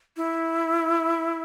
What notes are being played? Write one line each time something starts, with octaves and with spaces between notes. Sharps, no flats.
E4